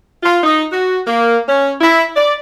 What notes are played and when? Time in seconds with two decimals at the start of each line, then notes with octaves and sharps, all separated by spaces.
0.23 F4
0.44 D#4
0.72 F#4
1.07 A#3
1.48 C#4
1.81 E4
2.16 D5